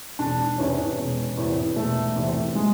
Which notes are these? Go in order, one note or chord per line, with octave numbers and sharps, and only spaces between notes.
E1 D4
E2 C3 E3 C#4
E1
E2 C3 E3
E1 A3
E2 C3 E3
G#3